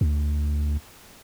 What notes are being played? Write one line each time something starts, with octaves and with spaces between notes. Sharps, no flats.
D2